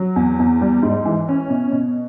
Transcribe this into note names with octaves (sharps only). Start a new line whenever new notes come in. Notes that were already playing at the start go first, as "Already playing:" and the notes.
Already playing: F#3
E2
E2
G3
G#2
E3
C#4
B2
B2